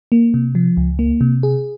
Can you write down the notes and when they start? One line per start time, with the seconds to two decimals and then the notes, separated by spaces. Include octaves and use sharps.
0.12 A#3
0.34 C3
0.55 F3
0.77 C#2
0.99 A#3
1.21 C3
1.43 G#4